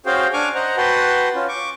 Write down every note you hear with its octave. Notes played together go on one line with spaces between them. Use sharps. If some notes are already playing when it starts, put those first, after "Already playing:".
C#4 F#4 G#4 C5 F5 G5
D4 G#5 C#6 D6 F6
C5 D#5 F#5 A#5
F#4 B4 F#5 G5 A5 C6
C#4 F4
C#6 D6